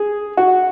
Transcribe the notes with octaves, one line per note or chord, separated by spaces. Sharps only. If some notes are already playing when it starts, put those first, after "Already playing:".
Already playing: G#4
F#4